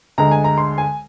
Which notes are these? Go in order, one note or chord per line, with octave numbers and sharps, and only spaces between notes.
D2 D3 G#3 A#5
G#5
A#5
C6
G#5